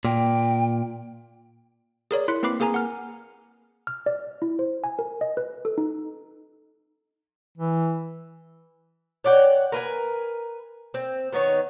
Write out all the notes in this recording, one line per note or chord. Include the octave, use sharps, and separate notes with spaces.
A#2 G5
G#4 A#4 C#5 D5
E4 C6 F#6 B6 C#7
A#3 C4 B4 B5 D6 C7
A#3 G#4 A#4 G#5 A#5
F#5 F6
F6
D5
E4
C5
G#5
A#4
D#5
B4
A4
D#4
E3
C#5 D5 F#5 G5
A#4 B4 F5 G#5
C4
D#3 B3 D#4 C#5